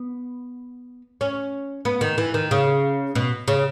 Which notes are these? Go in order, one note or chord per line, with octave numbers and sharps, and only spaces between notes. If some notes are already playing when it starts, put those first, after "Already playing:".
Already playing: B3
C#4
B3
D#3
E3
D#3
C#3
B2
C#3